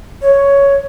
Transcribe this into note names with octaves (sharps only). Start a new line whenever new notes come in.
C#5